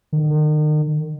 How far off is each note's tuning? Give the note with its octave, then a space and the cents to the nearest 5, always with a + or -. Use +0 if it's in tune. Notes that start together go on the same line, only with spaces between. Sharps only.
D#3 -40